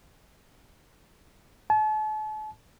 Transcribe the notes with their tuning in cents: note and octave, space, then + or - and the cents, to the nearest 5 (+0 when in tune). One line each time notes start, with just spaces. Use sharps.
A5 -40